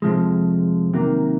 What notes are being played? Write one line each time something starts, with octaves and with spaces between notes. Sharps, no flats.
F2 C3 F3 G#3
C3 D#3 F#3 A#3